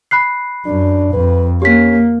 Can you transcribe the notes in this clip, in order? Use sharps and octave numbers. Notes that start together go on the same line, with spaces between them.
B5 F#6 C7
F#2 D4
F2 B4
A#3 C#4 G4 B6